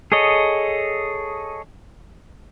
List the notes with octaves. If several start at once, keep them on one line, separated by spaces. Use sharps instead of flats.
G#4 A4 C#5 D#5